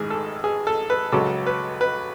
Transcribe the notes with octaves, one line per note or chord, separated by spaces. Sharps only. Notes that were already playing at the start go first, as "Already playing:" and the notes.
Already playing: A1 G#2 D#3 G#4
A4
G#4
A4
B4
C#2 C#3 F#3 A4
B4
B4